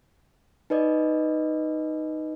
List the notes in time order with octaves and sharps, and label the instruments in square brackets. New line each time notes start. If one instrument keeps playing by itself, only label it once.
[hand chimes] D#4 B4 D5 D#5